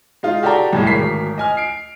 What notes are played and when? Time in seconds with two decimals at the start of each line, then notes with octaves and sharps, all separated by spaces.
0.23 G#3 D#4 F4
0.43 F#4 G4 A4 D5 G5 A#5
0.73 C2 A2 G#3
0.87 D1 G#1 A#4 B6 C7
1.38 D#5 G#5 F6
1.57 C7 D7